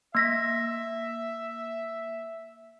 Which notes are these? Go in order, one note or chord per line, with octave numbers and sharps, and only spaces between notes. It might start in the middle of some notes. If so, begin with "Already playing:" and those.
A#3 E5 A#6 B6